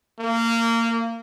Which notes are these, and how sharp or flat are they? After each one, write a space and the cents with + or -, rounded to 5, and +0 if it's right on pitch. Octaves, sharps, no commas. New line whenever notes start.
A#3 -20